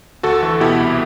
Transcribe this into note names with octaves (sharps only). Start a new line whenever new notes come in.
D2 F#4 A4
E3
B2 E4 G4
C2